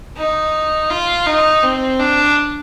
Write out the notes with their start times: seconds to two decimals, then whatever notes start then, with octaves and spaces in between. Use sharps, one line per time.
0.17 D#4
0.90 F4
1.26 D#4
1.63 C4
2.00 D4